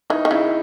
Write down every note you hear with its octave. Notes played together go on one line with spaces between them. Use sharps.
E3 D#4
D#3
C#3 E4